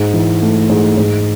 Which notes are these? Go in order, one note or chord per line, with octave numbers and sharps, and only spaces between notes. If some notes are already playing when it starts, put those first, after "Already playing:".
Already playing: G#2
E3
A3
G#2
G#2